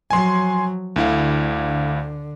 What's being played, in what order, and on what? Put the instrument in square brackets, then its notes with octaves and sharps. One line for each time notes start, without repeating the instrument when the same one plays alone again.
[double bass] F3 F#3 [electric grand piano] G#5 C6
[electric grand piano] D2 E4 F5 [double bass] D3